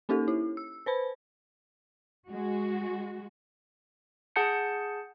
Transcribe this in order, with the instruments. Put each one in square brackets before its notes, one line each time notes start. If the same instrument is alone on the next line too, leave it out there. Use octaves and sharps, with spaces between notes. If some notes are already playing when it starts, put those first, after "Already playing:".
[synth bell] A#3 C#4 D#4 G4 A4
E4
E6
B4 C5 B5
[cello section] G#3 F#4
[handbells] G#4 F#5 A5 G6 C#7